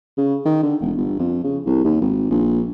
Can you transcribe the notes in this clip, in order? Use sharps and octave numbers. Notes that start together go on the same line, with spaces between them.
C#3
D#3
D3
E1
G1
F2
C#3
C2
D#2
G#1
A#1